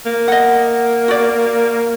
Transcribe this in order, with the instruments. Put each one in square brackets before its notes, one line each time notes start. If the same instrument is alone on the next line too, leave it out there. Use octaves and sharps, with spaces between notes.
[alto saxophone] A#3
[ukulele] D#5 F#5
F#4 D5